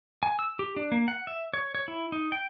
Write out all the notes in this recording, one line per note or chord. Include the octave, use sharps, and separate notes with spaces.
G#5
E6
G4
D4
A#3
F#5
E5
C#5
C#5
E4
D#4
G5